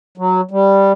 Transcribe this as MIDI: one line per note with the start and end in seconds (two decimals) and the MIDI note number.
0.18 0.41 54
0.51 0.92 55